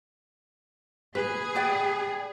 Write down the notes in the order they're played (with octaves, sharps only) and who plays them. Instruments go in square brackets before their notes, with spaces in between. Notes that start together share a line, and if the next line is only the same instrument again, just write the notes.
[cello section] G#4 [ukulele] B4
[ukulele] B4 D5 G5